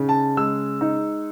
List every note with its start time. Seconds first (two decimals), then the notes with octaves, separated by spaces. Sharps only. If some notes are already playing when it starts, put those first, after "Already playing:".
Already playing: C#3 D#4
0.09 A5
0.37 G#3 E6
0.81 D#4